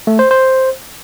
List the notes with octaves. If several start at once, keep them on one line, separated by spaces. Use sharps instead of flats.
A3
C5
C5